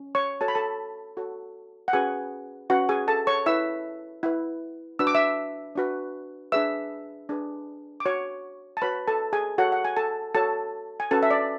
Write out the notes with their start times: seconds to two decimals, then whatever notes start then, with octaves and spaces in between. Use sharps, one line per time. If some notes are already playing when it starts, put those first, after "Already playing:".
Already playing: C#4
0.15 C#5 C#6
0.41 F#4 A4 C#5 A5
0.48 B5
0.55 A4 A5
1.17 F#4 A4 C#5
1.88 F#5
1.93 C#4 F#4 G#4 B4 G#5
2.70 C#4 F#4 B4 F#5
2.89 G#4 G#5
3.08 A4 A5
3.27 C#5 C#6
3.46 E4 B4 E5 E6
4.23 E4 B4
4.99 D4 F#4 B4 E6
5.07 D6
5.15 E5 E6
5.76 D4 F#4 B4
6.52 D4 G#4 B4 E5 E6
7.29 D4 G#4 B4
8.00 D6
8.05 F#4 C#5 C#6
8.77 A5
8.82 F#4 B4 C#5 B5
9.08 A4 A5
9.33 G#4 G#5
9.58 F#4 A4 C#5 F#5
9.72 F#5
9.85 G#5
9.97 A4 A5
10.35 F#4 A4 C#5 A5
11.00 G#5
11.11 C#4 F#4 A4 B4 A5
11.23 E5
11.30 D5